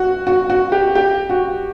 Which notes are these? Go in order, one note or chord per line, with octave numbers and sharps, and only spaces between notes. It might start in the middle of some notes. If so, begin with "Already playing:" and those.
Already playing: F#4
F#4
F#4
G4
G4
F#4